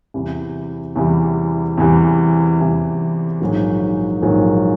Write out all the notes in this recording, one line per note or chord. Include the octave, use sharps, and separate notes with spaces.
E2 C3 E3 G3
E2 C3 E3 G3
E2 C3 E3 G3
E2 C3 E3 G3
A#1 G#2 D#3 F#3 A#3
A#1 G#2 D#3 F#3 A#3